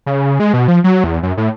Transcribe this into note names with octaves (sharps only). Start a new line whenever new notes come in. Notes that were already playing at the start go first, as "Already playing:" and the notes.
C#3
G#3
B2
F3
F#3
E2
F#2
A2